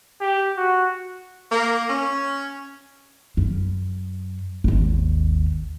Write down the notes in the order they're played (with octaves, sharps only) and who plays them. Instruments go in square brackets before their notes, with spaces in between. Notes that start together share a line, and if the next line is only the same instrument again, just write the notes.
[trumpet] G4
F#4
[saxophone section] A#3
C#4
[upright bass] F#2
G#1 D#2